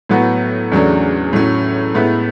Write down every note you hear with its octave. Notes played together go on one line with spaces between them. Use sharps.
A2 F#3 B3 F#4
E2 C#3 F#3 A3 D4
A2 F#3 C#4
A2 G#3 B3 E4 B4